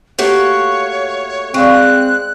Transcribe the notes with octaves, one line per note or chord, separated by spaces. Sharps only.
A3 A#3 F#4 G4 C#5
G#3 C4 D5 F5 C#6 F#6